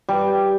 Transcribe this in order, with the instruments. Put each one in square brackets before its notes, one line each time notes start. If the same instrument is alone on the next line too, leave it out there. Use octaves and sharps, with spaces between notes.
[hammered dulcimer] G3